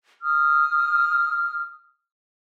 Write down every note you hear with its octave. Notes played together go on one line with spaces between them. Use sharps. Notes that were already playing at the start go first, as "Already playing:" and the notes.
D#6 F6